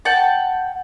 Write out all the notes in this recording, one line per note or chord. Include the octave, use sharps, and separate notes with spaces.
F#5 G5 A5